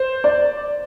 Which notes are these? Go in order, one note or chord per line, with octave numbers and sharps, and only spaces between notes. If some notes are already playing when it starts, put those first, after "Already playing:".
Already playing: C5
D5